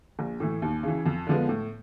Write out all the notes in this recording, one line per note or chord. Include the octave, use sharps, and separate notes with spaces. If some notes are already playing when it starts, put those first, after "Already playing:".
A#1
A2 E3
D#2
C#3 E3
F2
D3 F3 G#3 B3
A2